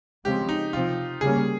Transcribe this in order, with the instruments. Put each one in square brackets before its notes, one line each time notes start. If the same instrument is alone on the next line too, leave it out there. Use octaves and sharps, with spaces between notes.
[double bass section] C#3 F3 G#3 C4 [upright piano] G4
[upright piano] D#4
[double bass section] C3 F3 C4 [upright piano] F4
[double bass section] C#3 G3 A#3 C#4 [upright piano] G#4